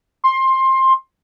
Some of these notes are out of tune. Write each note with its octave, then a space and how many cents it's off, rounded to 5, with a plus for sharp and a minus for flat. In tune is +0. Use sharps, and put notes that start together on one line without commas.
C6 +20